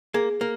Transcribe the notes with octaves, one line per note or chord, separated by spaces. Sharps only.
A#3 G#4
A#3